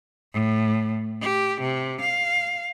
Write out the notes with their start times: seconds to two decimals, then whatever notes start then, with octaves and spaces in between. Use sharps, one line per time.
0.33 A2
1.22 G4
1.61 C3
2.01 F5